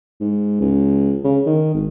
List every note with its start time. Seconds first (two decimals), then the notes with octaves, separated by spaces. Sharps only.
0.20 G#2
0.61 C#2
1.24 C#3
1.46 D#3
1.74 G#1